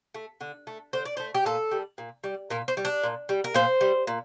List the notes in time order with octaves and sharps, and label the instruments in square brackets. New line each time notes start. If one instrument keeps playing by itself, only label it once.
[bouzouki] A3
D3
A3
D3 C5
D5
A3 C5
G4
A#2 A4
G3
A#2
G3
A#2 A#4
C5
G3
D4
A#2
G3
A#4
A#2 C5
G3
A#2